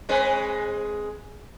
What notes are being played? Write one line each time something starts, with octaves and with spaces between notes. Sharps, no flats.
G#3 C4 B4